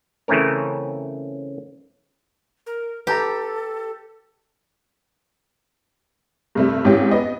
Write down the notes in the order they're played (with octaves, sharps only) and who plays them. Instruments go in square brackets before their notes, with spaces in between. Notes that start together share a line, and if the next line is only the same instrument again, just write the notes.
[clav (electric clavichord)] C#3 E3 A3 C4 C#4 A#4
[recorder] A#4
[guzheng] G4 [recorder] A4 [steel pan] B4 A5 A#5
[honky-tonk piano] G2 C3 A3
G#1 G#2 E3 C#4 G4
B3 D#5